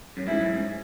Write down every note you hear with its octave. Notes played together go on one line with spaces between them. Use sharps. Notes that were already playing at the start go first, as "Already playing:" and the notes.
F#2
G#2 E4
F#2
G#2